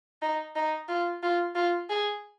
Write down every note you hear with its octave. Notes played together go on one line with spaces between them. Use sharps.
D#4
D#4
F4
F4
F4
G#4